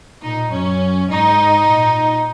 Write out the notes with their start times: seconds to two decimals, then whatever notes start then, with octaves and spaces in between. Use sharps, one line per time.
0.23 A#2 D#4
0.52 F#2 C#4
1.10 G#2 D#4
1.68 A#2